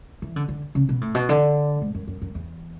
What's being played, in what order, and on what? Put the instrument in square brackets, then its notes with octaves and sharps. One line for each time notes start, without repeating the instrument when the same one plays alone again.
[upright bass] E3
D3
D3
C#3
B2
A2
B2
D3
G#2
F#2
F#2
F#2
E2